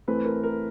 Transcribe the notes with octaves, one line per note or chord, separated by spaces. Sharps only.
A2 E3 A3 C4 B4
A#4
A#4